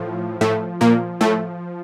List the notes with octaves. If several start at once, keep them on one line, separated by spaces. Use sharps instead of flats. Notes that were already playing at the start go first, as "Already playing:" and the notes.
Already playing: A2 F3
A2 A3
A#2 A#3
A2 A3